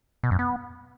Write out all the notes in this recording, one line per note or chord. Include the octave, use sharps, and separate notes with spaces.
B2
F#2
B3